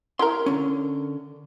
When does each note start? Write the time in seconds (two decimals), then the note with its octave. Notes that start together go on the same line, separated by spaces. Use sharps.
0.19 E4 G4 A#4 C6
0.46 D3 C#4